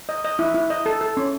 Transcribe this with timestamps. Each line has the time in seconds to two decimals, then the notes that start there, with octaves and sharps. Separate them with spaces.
0.09 D#5
0.24 D#5
0.39 E4
0.54 E4
0.70 D#5
0.86 A4
1.01 A4
1.17 C#4